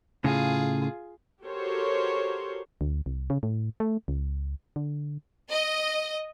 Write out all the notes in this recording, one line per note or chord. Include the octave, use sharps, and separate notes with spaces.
A2 C#3 F4 G#4
F#4 G4 A4 A#4 C5 C#5
D2
C2
C#3
A2
A3
C#2
D3
D#5